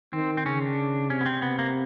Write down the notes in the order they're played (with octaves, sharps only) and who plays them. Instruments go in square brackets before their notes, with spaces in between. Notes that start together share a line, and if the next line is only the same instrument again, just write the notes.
[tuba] D#3 [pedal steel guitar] C4
[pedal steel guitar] C4
[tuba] C#3 [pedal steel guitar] C#4
[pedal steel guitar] D4
[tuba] C3 [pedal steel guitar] C#4
[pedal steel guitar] B3
C4
B3
A#3